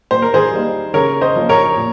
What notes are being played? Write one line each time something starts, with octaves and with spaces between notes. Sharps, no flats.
A#2 C5
A#4
G#4 C5
G3 A#3 D#4
C#3 A#4 C#5
C5 D#5
F3 A#3 C#4
A#4 C#5
A#2